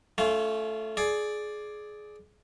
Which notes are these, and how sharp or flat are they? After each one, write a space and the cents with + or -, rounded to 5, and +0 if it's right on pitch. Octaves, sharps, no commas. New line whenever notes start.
A3 -5 C#4 +30 F4 -20
G#4 +20 D5 +0